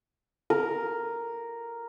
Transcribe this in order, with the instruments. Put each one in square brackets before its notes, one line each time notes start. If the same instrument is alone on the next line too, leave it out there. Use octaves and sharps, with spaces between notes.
[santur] A#4